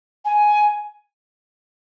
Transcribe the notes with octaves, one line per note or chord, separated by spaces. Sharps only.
G#5